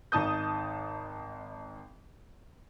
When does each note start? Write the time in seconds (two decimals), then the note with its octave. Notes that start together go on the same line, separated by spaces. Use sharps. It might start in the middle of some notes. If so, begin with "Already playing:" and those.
0.12 G#1 D#4 A5 D#6 G6